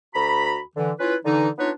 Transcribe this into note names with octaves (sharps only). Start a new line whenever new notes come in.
D2 F#4 A#5 B5
D3 E3
C#4 E4 F4 B4
D3 E3 D#4
B3 D4 D#4 F4 B4 C#5